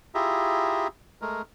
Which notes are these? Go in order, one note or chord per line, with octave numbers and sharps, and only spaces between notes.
E4 F4 G4 G#4 E5 A#5
G#3 A3 A#4